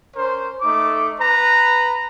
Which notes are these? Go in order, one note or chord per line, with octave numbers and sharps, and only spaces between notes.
C#4 A#4 C5
A3 D#4 D6
B4 A#5